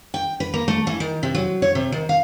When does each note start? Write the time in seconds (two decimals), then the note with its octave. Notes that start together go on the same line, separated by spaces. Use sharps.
0.14 G5
0.40 B4
0.54 A#3
0.68 A3
0.87 E3
1.00 D#3
1.23 C3
1.35 F#3
1.62 C#5
1.75 C3
1.92 D#3
2.09 F5